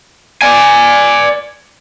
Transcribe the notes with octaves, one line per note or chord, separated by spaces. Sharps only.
D5 G#5